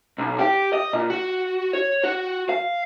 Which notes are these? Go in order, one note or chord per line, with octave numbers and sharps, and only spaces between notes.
B1
G4
D#5
A#2
F#4
C#5
F#4
F5